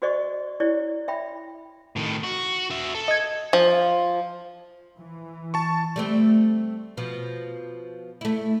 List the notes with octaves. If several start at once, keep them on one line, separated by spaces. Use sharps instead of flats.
F#4 G#4 C5 D5 D#5 C#6
E4 G4 C#5 D5
E5 G5 B5
A2 D#3
F#4
F#4 E5
A4
D#5 G#6
F3
E3
A5 C#6
G3 A3 C4
B2 F3
A3 E4